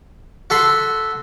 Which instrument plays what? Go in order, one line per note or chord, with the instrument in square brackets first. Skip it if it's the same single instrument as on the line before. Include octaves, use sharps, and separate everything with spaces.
[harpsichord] F#4 A4 B5 C6